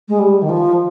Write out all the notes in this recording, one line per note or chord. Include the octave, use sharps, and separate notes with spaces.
G#3
G3
D#3
F3